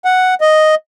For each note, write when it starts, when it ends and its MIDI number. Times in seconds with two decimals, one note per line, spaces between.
0.05 0.34 78
0.41 0.75 75